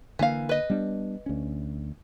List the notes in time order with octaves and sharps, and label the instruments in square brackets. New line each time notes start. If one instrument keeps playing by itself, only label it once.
[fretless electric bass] D3 A#3 [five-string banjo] E3 F5
[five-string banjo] B4 D#5
[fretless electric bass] G3 B3 D4
D2 C#4